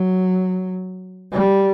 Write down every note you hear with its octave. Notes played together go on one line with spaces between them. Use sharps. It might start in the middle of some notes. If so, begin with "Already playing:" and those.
Already playing: F#3
G3